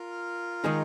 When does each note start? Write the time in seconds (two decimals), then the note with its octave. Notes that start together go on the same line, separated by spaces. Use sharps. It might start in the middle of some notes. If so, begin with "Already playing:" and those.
Already playing: F4 A#4
0.64 D#3 G#3 D#4